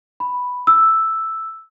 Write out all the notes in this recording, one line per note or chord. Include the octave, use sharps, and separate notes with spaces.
B5
E6